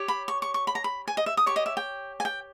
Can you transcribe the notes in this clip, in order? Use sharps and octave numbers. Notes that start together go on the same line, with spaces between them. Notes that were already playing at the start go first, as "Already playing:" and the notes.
Already playing: G4 C#5
B5
C#6
C#6
C#6
B5
A#5
B5
G#5
D#5
E5
D#6
G4 C#5 C#6
D#5
E5
G5
G#5
G5